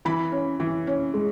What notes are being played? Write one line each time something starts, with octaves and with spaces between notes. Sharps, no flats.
E3 B5
C#4
E3
C#4
G#3